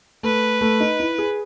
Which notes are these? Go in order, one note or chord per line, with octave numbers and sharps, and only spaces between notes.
A3 B4
A3
D#4
E4
G#4